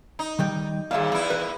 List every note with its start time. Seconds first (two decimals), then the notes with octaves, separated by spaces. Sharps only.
0.19 D#4
0.39 D#3 G3 G5
0.91 D#2 A#2 G#4 E5 F5
1.12 E2 E4
1.30 B4